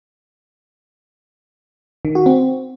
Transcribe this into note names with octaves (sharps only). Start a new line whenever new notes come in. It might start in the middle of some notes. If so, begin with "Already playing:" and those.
D#3
F#4
C4